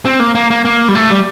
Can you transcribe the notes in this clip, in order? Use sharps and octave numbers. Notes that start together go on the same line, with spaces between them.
C4
A#3
A#3
A#3
A#3
G3
A3
G3